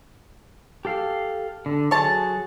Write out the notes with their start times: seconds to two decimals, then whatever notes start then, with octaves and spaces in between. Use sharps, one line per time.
0.85 G4 A4 F5
1.66 D3
1.91 F#3 G#4 A4 C#5 A5